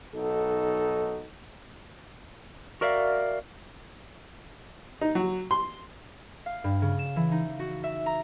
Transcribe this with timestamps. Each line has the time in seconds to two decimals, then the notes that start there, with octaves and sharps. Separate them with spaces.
0.15 B1 D#4 F#4 A4
2.81 F#4 A#4 D5 E5 F5
5.01 D#4
5.15 F#3
5.51 C6
6.46 F5
6.64 G2
6.82 C#3
6.99 E7
7.16 E3
7.32 D#4
7.60 F#4
7.84 E5
8.06 A#5